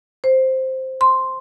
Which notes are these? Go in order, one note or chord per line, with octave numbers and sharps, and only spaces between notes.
C5
C6